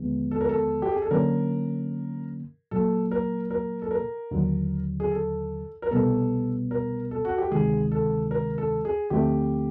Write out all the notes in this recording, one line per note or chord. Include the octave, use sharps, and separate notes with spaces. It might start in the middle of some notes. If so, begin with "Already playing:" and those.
Already playing: D#2 D3 F3 G#3 B3
A4
A#4
A4
G4
G#4
A4
D3 F#3 A#3 C#4 A#4
A#2 F#3 A#3 A4
A#4
A#4
A4
A#4
D#2 D3 F#3
G#4
A4
A#4
C2 B2 G3 B3 A4
A#4
A4
F#4
G4
D2 C3 D#3 G#3 G#4
A4
A#4
A4
G#4
D2 D3 F3 A3 C4 G4